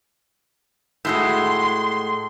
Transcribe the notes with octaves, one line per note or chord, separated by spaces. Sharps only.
A2 G#3 F#4 C6